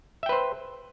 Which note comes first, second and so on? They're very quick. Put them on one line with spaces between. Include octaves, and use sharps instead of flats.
E5 G5 B4 C5